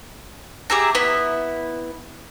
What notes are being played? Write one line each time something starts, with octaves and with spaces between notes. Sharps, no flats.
G4 G#4 E5 A#5
B3 E4